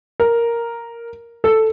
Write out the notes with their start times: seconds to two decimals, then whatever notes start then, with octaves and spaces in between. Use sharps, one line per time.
0.20 A#4
1.44 A4